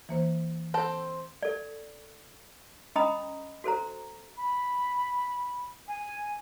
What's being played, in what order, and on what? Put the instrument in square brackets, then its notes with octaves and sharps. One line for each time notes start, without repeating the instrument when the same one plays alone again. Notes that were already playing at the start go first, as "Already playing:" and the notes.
[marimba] E3 A#3 C5
[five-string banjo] C4 A4 G5
[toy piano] A4 D5
C#4 D#5 G5 A#5 B5 D#6
F#4 A4 C5 A#5
[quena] B5
G#5